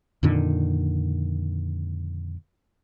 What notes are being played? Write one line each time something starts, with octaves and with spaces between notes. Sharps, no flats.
F2 A#2 D3 D#3